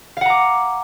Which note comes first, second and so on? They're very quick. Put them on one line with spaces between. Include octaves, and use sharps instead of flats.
F5 F#5 A#5 D6